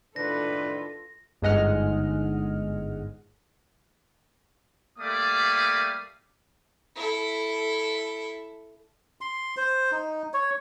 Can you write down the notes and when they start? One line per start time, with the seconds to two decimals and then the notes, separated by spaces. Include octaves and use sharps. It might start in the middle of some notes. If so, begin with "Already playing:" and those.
0.16 A2 D#3 D4 F4 A4 B4 A#6
1.42 G1 G#2 G#3 D#5 F#5 F6
4.99 G3 A3 A#3 D5 F5 D#6
6.96 E4 A4
9.21 C6
9.57 C5
9.92 D#4
10.34 C#5